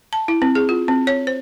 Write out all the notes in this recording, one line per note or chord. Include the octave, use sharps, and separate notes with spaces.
A5
E4
C4
G#4
F4
C4
C#5
C5